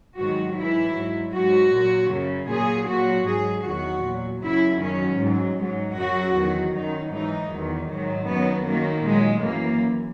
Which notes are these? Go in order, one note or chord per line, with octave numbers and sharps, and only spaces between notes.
G#2 D#3 F#3 F#4
G#2 E3 E4
G#2 F#3
G#2 F#3 F#4
A#2 F#3
F#2 C#3 F#3
A#2 F#3 G#4
A#2 F#3 F#4
G#2 F#3 G#4
E2 D#3 F#3 F#4
A#2 F#3
F#2 C#3 F#3 E4
F#2 D#3 F#3 C#4
G#2 F#3
G#2 F#3
F#2 C#3 F#3 F#4
E2 D#3 F#3
F#2 D#3 F#3 D#4
G#2 E3 D#4
E2 D#3 F#3
G#2 D#3 F#3
F#2 D#3 F#3 B3
F#2 D#3 F#3 A#3
A#2 F#3 G#3
F#2 E3 A#3